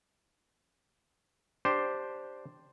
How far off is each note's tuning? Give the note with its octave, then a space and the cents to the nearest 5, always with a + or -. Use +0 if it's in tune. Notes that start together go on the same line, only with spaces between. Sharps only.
D4 +0 G4 +0 C5 +0